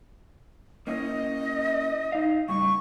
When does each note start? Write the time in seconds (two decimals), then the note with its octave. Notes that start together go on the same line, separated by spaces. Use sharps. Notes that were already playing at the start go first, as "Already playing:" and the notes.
0.87 A#3 C#4 E4 D#5
2.12 D#4 F5
2.49 A2 C#3 G3 C#6